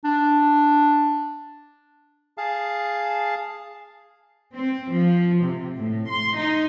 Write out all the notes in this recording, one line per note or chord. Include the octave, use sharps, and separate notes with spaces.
D4
G#4 F5 A5
C4
F3
C3
A2
C6
D#4